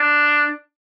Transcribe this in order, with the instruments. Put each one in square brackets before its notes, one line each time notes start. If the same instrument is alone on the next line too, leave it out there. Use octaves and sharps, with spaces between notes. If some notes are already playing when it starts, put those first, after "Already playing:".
Already playing: [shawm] D4